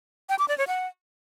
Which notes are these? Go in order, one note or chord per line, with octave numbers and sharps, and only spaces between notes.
G5
D6
D5
C#5
F#5